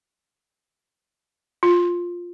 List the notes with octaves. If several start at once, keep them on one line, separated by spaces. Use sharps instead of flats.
F4